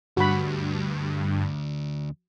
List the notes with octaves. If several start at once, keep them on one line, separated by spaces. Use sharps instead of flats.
D2 G2 F#4 B5